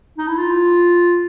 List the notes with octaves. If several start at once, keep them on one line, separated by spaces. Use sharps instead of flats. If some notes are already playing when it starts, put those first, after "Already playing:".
D#4
E4
F4